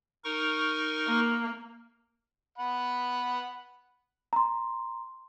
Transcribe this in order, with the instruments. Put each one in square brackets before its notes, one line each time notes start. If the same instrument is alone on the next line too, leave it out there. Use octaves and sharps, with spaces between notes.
[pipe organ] D#4 A#4 C#6
[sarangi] A#3
[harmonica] F#5 B5
[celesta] A#5 C6